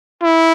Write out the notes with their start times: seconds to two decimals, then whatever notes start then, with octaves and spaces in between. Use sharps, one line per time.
0.23 E4